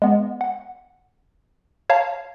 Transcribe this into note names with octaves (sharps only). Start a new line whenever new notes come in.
G#3 B3
F#5
C#5 F5 A5 A#5